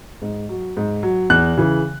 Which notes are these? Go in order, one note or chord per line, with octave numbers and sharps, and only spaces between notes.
G#2
F#3
G#2
F#3
E2 F#6
C#3 E3